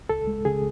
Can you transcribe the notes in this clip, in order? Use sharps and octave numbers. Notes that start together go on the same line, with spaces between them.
C#2 A4
G#3
C#3 G#4